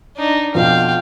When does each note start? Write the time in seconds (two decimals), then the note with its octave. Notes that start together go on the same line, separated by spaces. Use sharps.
0.17 D4 D#4
0.55 F2 B2 F3 F5 G5